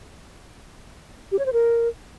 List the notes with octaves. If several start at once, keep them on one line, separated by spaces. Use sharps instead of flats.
G4
C#5
C5
A#4